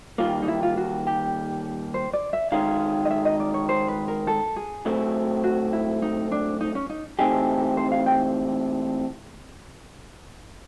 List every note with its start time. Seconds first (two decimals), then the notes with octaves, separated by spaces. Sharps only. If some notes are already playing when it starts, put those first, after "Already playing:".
0.18 D#2 D#3 G3 A#3 F4
0.42 D#4
0.48 E4
0.63 F4
0.77 F#4
1.07 G4
1.94 C5
2.13 D5
2.33 E5
2.52 D#3 G#3 C#4 F5
3.05 D#5
3.10 E5
3.25 D#5
3.40 D5
3.54 C#5
3.69 C5
3.88 B4
4.08 A#4
4.27 A4
4.56 G#4
4.85 B1 A2 F#3 A3 C4
5.44 F#4
5.73 E4
6.02 D#4
6.32 D4
6.61 D#4
6.75 C#4
6.90 D#4
7.19 E3 A3 C4 D#4 G4 G#4
7.77 C5
7.91 F5
8.06 G5